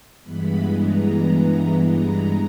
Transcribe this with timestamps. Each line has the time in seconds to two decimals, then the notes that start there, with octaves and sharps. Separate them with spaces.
0.23 G2 E3 G#3 B3 B5
0.76 A#5
1.84 A#5